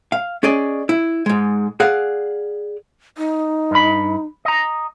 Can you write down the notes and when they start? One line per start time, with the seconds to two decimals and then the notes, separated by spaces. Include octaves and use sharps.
0.12 F5
0.43 C#4 G#4 D5 D#5
0.89 E4
1.26 G#2 G#3
1.80 G#4 D5 F5 F#5
3.18 D#4
3.71 G2 B5
4.45 D#5 A#5